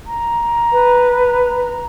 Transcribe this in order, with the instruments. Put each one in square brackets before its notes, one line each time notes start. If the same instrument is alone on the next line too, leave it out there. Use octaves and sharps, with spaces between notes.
[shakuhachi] A#5
[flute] B4